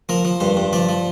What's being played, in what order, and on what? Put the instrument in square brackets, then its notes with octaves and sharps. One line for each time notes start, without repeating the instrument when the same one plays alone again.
[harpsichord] F3 A#4
F3
G2 C5
G2
F3 D5
F3